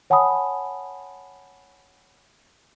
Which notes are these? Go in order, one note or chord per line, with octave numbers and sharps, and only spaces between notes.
C#5 F#5 G#5 A5 B5 D#6